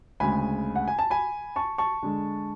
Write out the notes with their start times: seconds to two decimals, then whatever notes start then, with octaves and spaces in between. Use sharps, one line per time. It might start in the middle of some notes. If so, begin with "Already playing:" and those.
0.20 D2 C#3 G#3 G#5 B5
0.76 F#5
0.88 G#5
0.99 A5
1.11 G#5 B5
1.56 A5 C#6
1.78 A5 C#6
2.03 D3 G#3